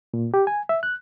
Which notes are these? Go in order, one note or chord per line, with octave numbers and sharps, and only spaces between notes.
A#2
G4
G#5
E5
F#6